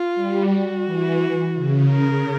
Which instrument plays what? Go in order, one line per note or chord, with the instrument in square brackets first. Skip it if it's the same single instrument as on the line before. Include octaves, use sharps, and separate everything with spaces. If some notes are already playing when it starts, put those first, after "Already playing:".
Already playing: [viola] F4
[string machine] G3
[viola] F#4
[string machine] E3
C#3
[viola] A#4